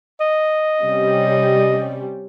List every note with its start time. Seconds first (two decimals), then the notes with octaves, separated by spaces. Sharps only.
0.20 D#5
0.83 C3 G3 C#4